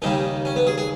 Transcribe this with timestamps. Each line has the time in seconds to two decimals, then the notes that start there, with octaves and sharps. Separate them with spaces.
0.02 D#2 C#3 G3 D#4
0.45 C#4
0.56 B3
0.67 G#4
0.78 G#4